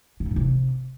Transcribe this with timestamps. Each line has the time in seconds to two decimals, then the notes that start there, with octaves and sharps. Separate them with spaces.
0.20 C3
0.26 C#3
0.31 A2
0.36 C3